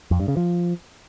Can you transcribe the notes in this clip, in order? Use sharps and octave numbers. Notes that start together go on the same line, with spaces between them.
F2
G2
C#3
F3